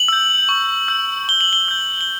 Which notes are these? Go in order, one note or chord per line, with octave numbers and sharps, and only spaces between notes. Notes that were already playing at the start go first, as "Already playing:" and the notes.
Already playing: F#7
E6 G6
C#6
E6 G6
C#6 G7
F#7
G7
E6 G6
G7